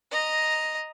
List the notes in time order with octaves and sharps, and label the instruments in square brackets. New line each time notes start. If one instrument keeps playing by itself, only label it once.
[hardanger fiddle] D#5 A#5